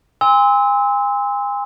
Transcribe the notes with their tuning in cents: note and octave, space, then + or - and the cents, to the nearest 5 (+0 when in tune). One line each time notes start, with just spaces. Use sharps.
G#5 -40 C6 -15 E6 -30